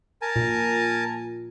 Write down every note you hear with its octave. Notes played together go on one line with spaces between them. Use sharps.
A#4 G#5 A5
A#2